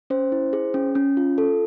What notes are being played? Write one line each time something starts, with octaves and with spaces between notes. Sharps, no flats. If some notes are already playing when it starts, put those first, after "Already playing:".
C#4 C5
E4
G#4
C#4
C#4
F4
A4